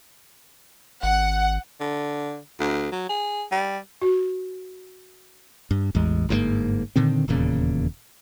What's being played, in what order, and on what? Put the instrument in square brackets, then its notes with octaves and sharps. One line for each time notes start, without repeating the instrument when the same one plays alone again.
[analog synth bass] G#1 [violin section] F#5
[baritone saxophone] D3
D2
F#3
G#4
G3
[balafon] F#4
[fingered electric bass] G2
A1 E2 G#3
G1 G#2 D3 A#3
A#2 D3 D#3 C4
D#1 E2 A#2 C#3